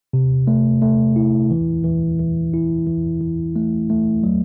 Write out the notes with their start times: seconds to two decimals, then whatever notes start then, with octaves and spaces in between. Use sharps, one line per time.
0.13 C3
0.47 A3
0.82 A3
1.16 E4
1.51 E3
1.84 E3
2.19 E3
2.53 E4
2.87 E3
3.21 E3
3.56 A3
3.90 A3
4.23 F#3